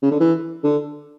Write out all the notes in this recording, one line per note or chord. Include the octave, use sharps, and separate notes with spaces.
C#3
D3
E3
D3